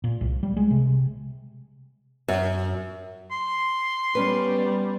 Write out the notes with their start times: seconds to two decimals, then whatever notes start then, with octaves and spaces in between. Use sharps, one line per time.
0.04 A#2
0.21 C2
0.43 G3
0.57 G#3
0.71 C3
2.28 F#2
3.31 C6
4.15 G3 B3 C#4 B4